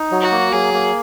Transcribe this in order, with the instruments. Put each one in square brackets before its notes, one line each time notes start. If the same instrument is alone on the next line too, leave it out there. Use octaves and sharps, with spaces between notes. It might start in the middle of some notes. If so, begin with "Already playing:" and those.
Already playing: [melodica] D#4
F#3
[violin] F#4
[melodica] A#3
[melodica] F#3 [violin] G#4
[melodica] A#3